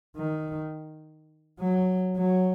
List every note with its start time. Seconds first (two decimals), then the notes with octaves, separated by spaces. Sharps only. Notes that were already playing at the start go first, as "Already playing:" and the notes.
0.17 D#3
1.60 F#3
2.17 F#3